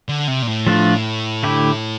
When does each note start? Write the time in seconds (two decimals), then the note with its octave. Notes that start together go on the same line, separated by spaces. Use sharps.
0.09 D3
0.28 C3
0.42 A#2
0.47 A2
0.67 F3 A3 D4 F4
1.43 D3 A3 E4 G4